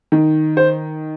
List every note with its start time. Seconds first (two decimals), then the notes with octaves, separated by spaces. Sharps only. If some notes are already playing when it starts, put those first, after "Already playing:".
0.12 D#3
0.57 C5